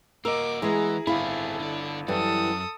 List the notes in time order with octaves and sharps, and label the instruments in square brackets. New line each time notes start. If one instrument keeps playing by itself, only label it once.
[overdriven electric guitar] A#3 F#4 [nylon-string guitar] A#4 [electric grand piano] D#5 E6 [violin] D6
[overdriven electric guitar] E3 [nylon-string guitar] G#3 B3 [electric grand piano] E4 G#4 [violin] A#5
[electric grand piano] G1 F5 B5 [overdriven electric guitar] C4 G#4 [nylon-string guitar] E4 [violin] A4
[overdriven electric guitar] D3 D4
[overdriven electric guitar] F#2 [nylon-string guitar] E3 G3 [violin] A4 D#6